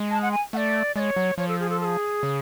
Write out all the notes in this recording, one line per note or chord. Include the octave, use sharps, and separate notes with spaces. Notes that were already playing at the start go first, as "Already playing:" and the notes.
Already playing: G#3
A5
F#5
G#5
A3 D5 F#5
G#3 C#5 D5
F#3
F3 C#5
A4
G#4
A4
A4
G#4
C#3